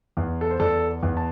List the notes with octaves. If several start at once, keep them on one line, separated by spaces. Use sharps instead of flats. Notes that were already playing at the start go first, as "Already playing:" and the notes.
E2
A4
C5
E2 A4 D5
E2
A5